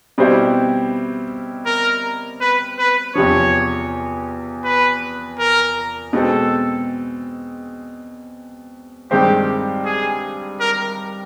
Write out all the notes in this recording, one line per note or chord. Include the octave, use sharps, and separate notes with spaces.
B2 G3 C4 E4
A#4
B4
B4
E2 C3 F3 C#5
B4
A#4
B2 G#3 C4 A4
G2 D#3 G#3 C4 G4
G#4
A#4